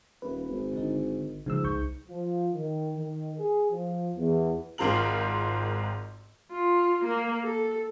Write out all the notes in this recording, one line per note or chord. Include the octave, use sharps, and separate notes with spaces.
D#1 B4
G#1
D3 D#4
G#2 C#3 F3 E6
C2 C#6 G6
F3
D#3
D#3
G#4
F3
E2
G#1 G#2 C4 F4 A#4 F#7
F4
A#3
A4